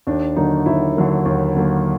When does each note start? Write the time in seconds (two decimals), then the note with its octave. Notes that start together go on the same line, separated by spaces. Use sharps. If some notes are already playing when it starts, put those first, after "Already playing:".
0.07 D#2 D4
0.36 D3 F#3 A#3 D#4
0.66 D#2 E4
0.97 D3 F#3 A#3
1.25 D#2
1.55 D3 F#3 A#3